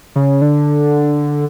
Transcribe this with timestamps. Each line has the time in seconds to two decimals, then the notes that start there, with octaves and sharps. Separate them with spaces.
0.16 C#3
0.41 D3